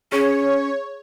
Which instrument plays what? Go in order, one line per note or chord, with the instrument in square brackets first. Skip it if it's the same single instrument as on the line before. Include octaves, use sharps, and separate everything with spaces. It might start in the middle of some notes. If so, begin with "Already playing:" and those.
[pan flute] C#4 [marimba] G#4 [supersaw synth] C#5